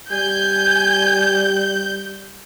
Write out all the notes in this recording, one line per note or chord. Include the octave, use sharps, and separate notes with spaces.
G3 G#5 G6